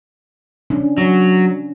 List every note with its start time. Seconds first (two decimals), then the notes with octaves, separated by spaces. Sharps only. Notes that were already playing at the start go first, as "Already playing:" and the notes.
0.70 C#4 D4
0.98 F#3